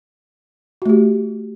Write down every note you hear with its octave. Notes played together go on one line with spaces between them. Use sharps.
A3 F#4 G4